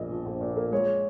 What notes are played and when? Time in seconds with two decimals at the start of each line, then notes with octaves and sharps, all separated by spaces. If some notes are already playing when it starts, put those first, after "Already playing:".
Already playing: A#1 A#2 F3 A#3 D#5
0.10 F3
0.26 A#1
0.41 A#2
0.56 A#3
0.72 G#3 C#5